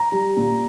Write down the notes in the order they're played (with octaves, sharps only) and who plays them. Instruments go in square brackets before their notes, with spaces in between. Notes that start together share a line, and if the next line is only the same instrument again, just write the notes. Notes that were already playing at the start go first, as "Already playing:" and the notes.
Already playing: [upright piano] A#5
G3
A#2